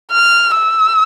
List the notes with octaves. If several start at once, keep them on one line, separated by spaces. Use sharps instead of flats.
F6
E6